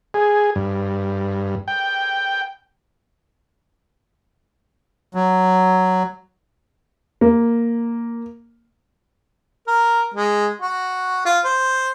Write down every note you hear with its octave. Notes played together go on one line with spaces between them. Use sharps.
G#4
G2
G5
F#3
A#3
A#4
G#3
F#4
F4
C5